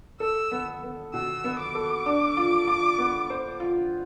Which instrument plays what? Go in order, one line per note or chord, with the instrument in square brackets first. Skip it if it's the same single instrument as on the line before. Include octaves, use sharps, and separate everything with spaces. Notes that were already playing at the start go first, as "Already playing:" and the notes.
[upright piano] A4 [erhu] E6
[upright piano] B3
B3
[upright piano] B2 [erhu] E6
[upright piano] B3
[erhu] D6
[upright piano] A4
D4
F4
F4
B3
C5
F4